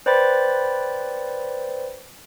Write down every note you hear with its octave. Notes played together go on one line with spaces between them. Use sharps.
B4 C5 D5 G5 B5 A6